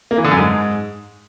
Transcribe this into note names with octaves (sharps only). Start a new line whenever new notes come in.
A#3
E3
D3
F#2
G#2